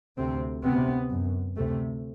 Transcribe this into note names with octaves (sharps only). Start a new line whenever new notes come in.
D2 C3 C4
D2 C3 B3
F#2
D2 C3 A3